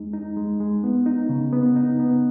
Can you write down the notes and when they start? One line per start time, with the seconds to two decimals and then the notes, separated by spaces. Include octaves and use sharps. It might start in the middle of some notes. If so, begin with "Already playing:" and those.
Already playing: E2 G#3 D#4
0.13 D#4
0.37 G#3
0.60 G#3
0.84 B3
1.06 D#4
1.29 C#3
1.52 B3
1.76 D#4
1.99 B3